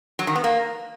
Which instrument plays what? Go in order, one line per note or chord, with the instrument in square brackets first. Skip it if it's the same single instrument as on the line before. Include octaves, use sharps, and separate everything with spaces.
[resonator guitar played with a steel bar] F#3
D#3
B3
A#3